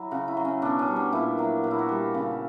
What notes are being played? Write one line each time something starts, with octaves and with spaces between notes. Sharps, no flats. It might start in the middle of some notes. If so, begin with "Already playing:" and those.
Already playing: F#3 E4
C#3 F#4
E4
F#3
C#4
B2 D4
C#4
G3
D4
A#2 E4
F#3 E4
A#2 F#4
E4
F#4
G3
C#3